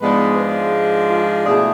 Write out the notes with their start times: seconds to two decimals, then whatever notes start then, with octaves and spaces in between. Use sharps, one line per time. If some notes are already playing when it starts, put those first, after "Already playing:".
0.01 G#2 F3 G#3 B3 D4 B4
0.37 G#4
1.10 F4
1.46 B2 A3 E4 G#4